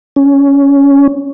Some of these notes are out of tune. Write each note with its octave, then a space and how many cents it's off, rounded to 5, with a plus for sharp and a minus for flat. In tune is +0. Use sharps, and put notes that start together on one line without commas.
C#4 +10